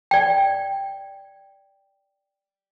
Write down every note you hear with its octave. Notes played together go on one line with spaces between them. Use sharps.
D5 G5